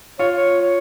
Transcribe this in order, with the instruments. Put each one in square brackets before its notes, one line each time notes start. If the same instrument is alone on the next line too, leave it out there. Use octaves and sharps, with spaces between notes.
[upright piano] F4 [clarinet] C#5
[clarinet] C#5
C#5